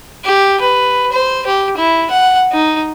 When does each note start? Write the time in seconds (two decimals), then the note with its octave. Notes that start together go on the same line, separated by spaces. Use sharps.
0.25 G4
0.61 B4
1.12 C5
1.46 G4
1.77 E4
2.11 F#5
2.52 D#4